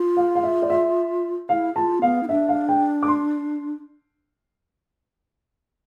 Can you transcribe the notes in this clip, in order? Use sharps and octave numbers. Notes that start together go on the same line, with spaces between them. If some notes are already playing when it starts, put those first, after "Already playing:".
Already playing: F4
F5
F5
E5
D5
E5
E4 F5
F4 A5
B3 F5
E4
D4 E5
F5
G5
D6
C6